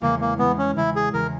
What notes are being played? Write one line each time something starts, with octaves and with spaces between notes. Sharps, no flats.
E2 C#3 G#3 A#3
A#3
E2 C#3 G#3 B3
C#4
E2 C#3 G#3 E4
G#4
E2 C#3 G#3 A#4